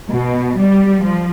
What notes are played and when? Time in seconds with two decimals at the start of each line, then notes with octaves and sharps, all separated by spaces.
0.12 B2
0.57 G3
1.03 F3